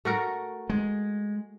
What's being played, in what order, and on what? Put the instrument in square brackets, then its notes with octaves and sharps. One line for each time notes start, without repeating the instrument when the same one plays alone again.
[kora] A3 F#4 A#4
[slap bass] G#3